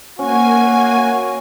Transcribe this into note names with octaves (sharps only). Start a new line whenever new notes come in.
A#3 C#4 F#4 G#5